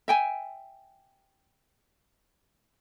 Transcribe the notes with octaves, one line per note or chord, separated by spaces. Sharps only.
E5 G5 G#5